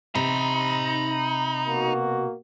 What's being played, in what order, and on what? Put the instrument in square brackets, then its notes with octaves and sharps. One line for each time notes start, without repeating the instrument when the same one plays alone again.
[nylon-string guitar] C3 [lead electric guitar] D#4 [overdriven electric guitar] A#5 B5
[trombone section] B2 A#3 F#4